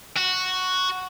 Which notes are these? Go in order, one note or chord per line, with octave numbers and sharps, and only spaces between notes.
F#4